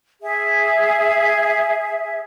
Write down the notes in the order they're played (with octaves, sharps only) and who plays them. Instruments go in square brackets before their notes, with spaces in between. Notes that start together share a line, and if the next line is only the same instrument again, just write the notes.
[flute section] G#4 E5